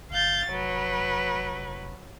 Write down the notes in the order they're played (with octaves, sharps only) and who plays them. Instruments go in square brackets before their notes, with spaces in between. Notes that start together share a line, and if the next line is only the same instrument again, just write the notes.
[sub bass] G1 [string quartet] F5 G6 A6
[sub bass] F1 [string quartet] F#3 B4